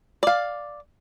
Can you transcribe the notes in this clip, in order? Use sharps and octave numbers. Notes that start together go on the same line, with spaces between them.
D5 F5